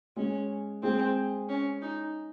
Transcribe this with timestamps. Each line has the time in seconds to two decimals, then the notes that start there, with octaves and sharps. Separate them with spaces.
0.16 G#3 C#4 G#4
0.83 G#3 C4 G#4
1.49 C#4
1.82 D#4